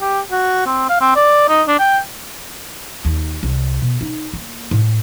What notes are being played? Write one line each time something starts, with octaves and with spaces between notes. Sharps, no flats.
G4
F#4
C4
F5
C4
D5
D#4
D4
G5
D#2
C2
B2
D#4
A#3
A2